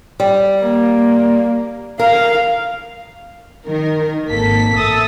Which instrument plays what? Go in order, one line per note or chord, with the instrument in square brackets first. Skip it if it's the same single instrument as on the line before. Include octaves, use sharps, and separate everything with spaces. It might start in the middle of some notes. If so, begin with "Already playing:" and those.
[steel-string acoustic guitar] G3
[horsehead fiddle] A#3
[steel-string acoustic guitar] A#4 [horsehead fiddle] F5
[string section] D#3 A#4
G#1 A#3 A4 B6
A1 A4 E5 D#6 A6